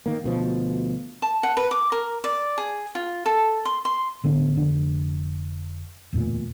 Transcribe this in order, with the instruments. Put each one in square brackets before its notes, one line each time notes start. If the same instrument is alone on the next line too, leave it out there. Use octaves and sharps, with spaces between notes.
[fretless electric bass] D#3 A#3
D2 B2 F3
[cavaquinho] A5
F#5
B4
D6
A#4
D5
G#4
F4
A4
C6
C6
[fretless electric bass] A1 D3 B3 D4
F1 D3 D4
D1 E2 A#2 A3